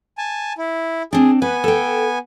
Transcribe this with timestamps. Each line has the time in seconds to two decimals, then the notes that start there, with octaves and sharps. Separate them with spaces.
0.18 G#5 A5
0.58 E4
1.13 C4 D4 G#4
1.42 B3 B4 G#5
1.64 A4 G5